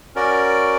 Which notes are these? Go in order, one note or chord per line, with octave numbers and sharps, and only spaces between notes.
C#4 F#4 A#4 D5